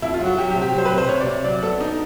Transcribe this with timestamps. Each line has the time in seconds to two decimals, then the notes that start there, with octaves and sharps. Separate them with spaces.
0.02 F2 E4
0.14 F4
0.20 F#3
0.26 F#4
0.38 F#3 G4
0.50 G4
0.55 C3
0.62 G4
0.74 F#3 C5
0.85 B4
0.91 C3
0.98 C5
1.09 C3 C#5
1.20 D5
1.27 C3
1.44 F#3 D5
1.62 B3 A4
1.80 D4 D#4